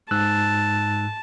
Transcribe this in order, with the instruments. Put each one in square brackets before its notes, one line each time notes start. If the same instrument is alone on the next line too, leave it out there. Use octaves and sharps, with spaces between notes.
[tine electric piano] G#2 E6 F#6 [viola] A5